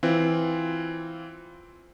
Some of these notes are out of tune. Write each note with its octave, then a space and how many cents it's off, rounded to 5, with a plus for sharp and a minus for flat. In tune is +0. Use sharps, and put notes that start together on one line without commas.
E3 +0 C4 +0 F4 +0